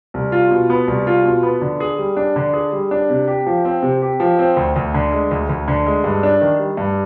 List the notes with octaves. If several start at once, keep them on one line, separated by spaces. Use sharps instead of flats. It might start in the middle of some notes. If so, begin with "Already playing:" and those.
C2
F4
B2
B3
C2
F4
B2
B3
D3
G#4
G3
D4
D3
G#4
G3
D4
C3
G4
F3
C4
C3
G4
F3
C4
D2
D2
D3
G#3
D2
D2
D3
G#3
G2
D4
D#3
G3
G2